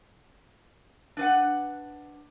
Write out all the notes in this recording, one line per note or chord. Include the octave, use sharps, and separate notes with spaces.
D4 B4 F#5